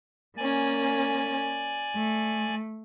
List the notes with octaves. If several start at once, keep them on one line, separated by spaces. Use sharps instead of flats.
A#3 C#4 D5 G#5
A3